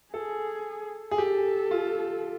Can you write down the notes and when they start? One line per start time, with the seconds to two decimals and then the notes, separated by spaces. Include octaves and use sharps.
0.14 G#4 A4
1.11 G#4
1.18 G4 A4
1.71 F4